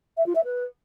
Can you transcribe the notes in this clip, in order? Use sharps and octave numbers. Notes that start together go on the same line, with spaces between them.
E5
F4
E5
B4